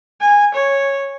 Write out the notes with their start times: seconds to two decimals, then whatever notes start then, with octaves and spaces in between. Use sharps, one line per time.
0.21 G#5
0.54 C#5